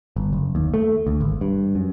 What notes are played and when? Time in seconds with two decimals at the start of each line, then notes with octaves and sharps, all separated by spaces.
0.16 G1
0.33 F#1
0.55 D#2
0.74 A3
1.07 D2
1.21 G#1
1.41 G2
1.75 F#2